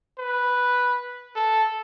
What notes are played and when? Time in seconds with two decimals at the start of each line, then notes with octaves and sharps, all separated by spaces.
0.18 B4
1.35 A4